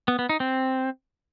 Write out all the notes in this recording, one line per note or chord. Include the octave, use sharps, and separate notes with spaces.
B3
B3
D#4
C4